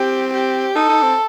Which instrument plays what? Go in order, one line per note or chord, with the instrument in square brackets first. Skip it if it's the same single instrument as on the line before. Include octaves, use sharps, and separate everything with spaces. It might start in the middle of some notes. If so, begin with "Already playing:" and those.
Already playing: [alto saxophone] C4 [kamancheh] G4
[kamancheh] G4
[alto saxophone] D#4 [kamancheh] A4
[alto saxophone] D#4
C4